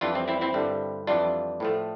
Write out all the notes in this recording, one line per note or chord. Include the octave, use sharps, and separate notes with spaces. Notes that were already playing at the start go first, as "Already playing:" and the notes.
F2 E3 G3 D4 F4
C4
C4 E4
C4 E4
G2 D3 G3
F2 E3 G3 D4 F4
A2 F3 A3